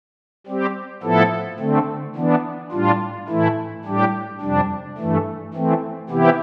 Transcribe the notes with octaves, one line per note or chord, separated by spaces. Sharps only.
G3 C4 G4
A2 F3 B3 E4 A4
D3 A3 C4
E3 B3 D4
A2 G3 D4 F4
A2 E3 A3 E4
A2 G3 D4 G4
F2 C3 G3 D4
G2 E3 A3
E3 A3 C4
C3 E3 B3 E4 G4